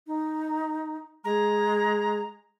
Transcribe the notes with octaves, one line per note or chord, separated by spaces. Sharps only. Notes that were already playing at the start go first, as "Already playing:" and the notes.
D#4
G#3 A#5